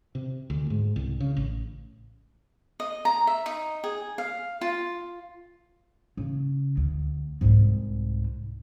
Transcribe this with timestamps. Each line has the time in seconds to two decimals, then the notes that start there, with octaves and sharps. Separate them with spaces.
0.15 C3
0.50 D2
0.70 G#2
0.96 C2
1.20 C#3
1.37 A1
2.80 D#5
3.05 A#5
3.27 E5
3.46 D#4
3.84 G#4
4.18 F5
4.61 F4
6.17 C#3
6.77 D2
7.41 C2 G#2